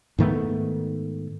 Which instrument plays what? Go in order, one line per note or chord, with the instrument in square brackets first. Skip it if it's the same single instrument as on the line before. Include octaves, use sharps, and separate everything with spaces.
[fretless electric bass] G#2 D#3 A3 B3